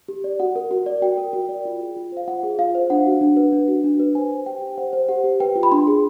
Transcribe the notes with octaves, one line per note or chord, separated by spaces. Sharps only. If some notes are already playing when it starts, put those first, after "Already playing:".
G4
D5
F#4 F#5
A#4
F#4
D5
F#4 G5
A#4
F#4
D5
F4
G#4
F4
C5 F5
F4 F#5
G#4
F4 F5
C5
D4 F#5
F#4
D4
B4
D4
F#4
D4
B4
C5 G#5
C5
G4 G5
G4
C5 F#5
C5
G4 F#5
G4
B4 G5
F4
B5
D4 C6
G#4